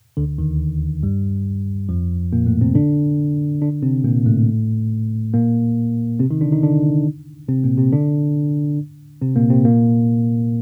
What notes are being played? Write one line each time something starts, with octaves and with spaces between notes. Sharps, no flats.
D2 D3
D#2 D#3
G2 G3
F2 F3
A#2 A#3
A2 A3
C3 C4
D3 D4
D3 D4
C3 C4
A#2 A#3
A2 A3
A#2 A#3
C3 C4
D#3 D#4
D3 D4
D#3 D#4
D3 D4
C3 C4
A#2 A#3
C3 C4
D3 D4
C3 C4
A#2 A#3
C3 C4
A#2 A#3